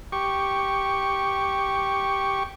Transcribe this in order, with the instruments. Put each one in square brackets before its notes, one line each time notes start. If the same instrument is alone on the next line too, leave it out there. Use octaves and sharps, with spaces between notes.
[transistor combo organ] G4 C#6